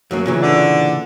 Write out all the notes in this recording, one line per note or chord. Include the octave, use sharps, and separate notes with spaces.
F#2 F#3 A#3
A#2 C#3 E3
D3 D4 D5